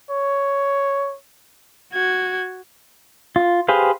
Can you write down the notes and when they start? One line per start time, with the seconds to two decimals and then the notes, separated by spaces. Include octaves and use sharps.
0.10 C#5
1.93 F#4 G#6
3.36 F4
3.68 G4 G#4 B4 C5 F5